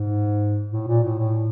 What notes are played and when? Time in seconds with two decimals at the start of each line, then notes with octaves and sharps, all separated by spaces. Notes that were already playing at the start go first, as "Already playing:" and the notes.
Already playing: G#2
0.71 A2
0.87 A#2
1.03 A2
1.18 A2